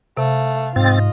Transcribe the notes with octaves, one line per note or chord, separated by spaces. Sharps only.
C3 A3 F5
G#2 C4 F4 D#5 A6